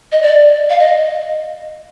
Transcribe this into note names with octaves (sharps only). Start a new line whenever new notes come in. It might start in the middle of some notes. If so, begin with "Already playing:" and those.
D#5
D5
F5
D#5